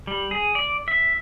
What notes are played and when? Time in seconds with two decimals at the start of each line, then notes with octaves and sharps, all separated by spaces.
0.07 G3
0.31 G#4
0.55 D5
0.88 E5